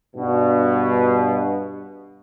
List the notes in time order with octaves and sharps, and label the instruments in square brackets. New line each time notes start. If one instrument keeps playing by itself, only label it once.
[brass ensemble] G2 B2